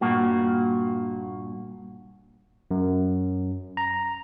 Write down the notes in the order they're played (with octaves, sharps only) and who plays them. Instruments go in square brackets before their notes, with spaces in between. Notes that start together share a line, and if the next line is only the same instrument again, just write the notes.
[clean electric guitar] G2 A#2 A#3 F#4
[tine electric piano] F#2
A#5